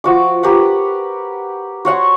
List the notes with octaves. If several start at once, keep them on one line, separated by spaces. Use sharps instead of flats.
F3 F#4 D6
G4 A#4 B4 F#5
F#4 C#5 F#5 C6